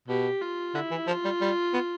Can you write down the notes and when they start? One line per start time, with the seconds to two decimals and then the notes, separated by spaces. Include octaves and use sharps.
0.08 B2 G4
0.42 F4
0.74 D3 E4
0.91 E3
1.07 F3 F4
1.24 G3
1.41 G3
1.73 B3